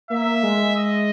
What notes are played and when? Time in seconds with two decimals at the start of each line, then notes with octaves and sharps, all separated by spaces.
0.10 A#3 E5
0.43 G#3
0.76 D#5